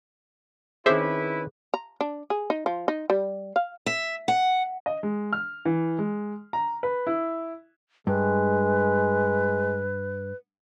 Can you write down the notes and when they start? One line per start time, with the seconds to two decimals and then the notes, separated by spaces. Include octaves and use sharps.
0.86 D#3 C4 C#4 E4 G#4 B4 C5 E5
1.74 A#5
2.01 D4
2.30 G#4
2.50 D#4
2.66 F3
2.88 D#4
3.10 G3
3.56 F5
3.86 E5
4.28 F#5
4.86 D#5
5.03 G#3
5.33 F6
5.65 E3
5.99 G#3
6.53 A#5
6.83 B4
7.07 E4
8.07 G2 G#3 B4